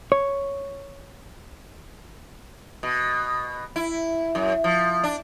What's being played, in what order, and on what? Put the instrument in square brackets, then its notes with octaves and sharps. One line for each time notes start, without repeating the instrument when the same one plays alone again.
[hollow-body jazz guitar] C#5
[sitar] B2
E4
F#2
F3
D4